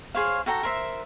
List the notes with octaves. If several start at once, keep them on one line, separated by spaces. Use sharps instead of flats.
G#4 C5 C#5 F5
F#4 A4 G5 A#5
A#4 C5 E5